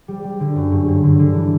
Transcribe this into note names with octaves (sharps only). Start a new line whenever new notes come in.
G3
G3
D3
F#2
G2
G2
D3
D3
E3